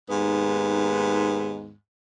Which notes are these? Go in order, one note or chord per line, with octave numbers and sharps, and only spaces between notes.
D#2 G#2 B3